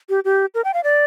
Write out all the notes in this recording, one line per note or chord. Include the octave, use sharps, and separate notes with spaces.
G4
G4
A#4
G5
F5
D5